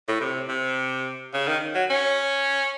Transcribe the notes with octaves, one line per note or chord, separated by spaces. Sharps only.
A2
C3
C3
C#3
D#3
F#3
C#4